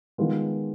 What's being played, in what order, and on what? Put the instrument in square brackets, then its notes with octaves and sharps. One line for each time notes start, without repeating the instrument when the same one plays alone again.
[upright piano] D#3 G#3 B3 F4